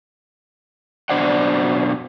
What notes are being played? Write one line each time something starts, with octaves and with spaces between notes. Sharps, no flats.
F#2 B2 D4 C5 D5 F#5